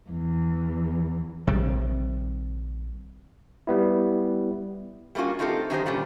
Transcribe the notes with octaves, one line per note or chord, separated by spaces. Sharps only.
E2
A#1 C3 D#3 G3
G3 B3 E4
G3 A3 A#3 C#4 F4 F#4
A3 C4 D#4 F4 G4 A4
F#2 D3 D#3 D#4 G4 C5
A#2 D3 G3 C#4 F4